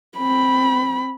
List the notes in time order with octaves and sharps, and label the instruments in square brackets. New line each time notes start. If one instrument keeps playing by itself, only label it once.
[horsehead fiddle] C4 B5